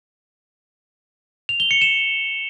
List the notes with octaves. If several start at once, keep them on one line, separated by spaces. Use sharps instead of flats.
F7
G7
C#7
E7